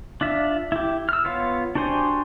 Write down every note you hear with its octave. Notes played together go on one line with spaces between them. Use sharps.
D4 F4 E5
E4 G4
E6 F6
B3 F4 C#5 F5
D4 F#4 G4 C5 G#5